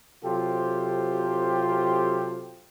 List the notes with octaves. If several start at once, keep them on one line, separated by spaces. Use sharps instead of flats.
C3 F#3 F4 G4 A4 C5